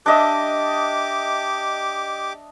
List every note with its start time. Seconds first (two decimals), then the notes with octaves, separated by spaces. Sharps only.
0.06 D4 G4 D#5 E5 D6